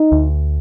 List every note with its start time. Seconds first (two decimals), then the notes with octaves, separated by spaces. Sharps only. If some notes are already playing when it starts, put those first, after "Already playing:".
Already playing: D#4
0.12 D2